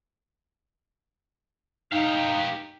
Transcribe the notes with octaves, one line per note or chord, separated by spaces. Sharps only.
D#4 G4 F5